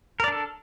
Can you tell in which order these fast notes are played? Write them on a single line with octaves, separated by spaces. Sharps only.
A#4 D5 D4 A4